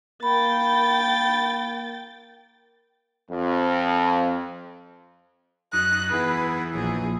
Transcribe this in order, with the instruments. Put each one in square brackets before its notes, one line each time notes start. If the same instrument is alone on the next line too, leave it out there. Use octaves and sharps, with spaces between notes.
[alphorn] A#3 [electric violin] G5 A6 [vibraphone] B5
[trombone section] F2
[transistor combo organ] F#2 D#4 [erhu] F#6
[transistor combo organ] E2 [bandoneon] B3 E4 G#4 [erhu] B4
[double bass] A#1 [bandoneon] E3 F#3 [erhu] G#4